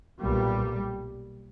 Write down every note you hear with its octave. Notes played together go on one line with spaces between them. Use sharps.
B1 A#2 G3